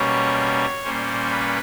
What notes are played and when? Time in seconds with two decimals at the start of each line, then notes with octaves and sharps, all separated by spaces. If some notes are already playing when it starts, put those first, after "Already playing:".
Already playing: B2 G3 A#3 C#4 C#5
0.84 A#2 G3 A#3 C#4 C5
1.30 B4